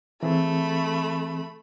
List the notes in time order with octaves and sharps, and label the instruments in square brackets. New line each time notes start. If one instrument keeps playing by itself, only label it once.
[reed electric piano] E3 C4 G#4 [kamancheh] A3 B5